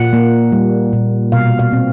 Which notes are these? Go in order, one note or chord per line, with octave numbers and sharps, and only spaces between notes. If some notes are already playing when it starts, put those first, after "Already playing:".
Already playing: A#2 F#5
A#3
G3
A#2
B2 F5
F5
C4